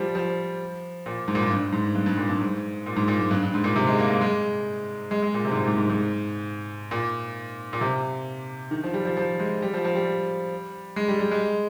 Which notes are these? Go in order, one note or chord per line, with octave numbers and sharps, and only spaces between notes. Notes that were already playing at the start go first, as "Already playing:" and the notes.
Already playing: F3 G3
F3
A#2
G#2
A#2
G#2
G2
G#2
G2
G2
A#2
G2
G#2
A#2
G#2
A#2
G#2
G2
G2
G#2
A#2
C3
G#3
A#3
A#3
G#3
G#3
G#3
A#2
C3
G#2
A#2
G#2
G#2
G#2
A#2
A#2
C3
D#3
F3
G3
F3
F3
G#3
G3
F3
F3
G3
G#3
G3
G3
G#3